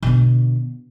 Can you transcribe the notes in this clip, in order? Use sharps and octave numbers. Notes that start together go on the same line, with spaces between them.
B2 D3